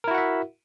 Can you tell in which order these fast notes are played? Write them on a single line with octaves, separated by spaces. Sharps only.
A#4 E4 F#4 F#5 E5